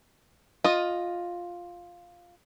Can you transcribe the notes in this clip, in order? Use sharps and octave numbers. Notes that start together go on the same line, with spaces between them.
F4 D#5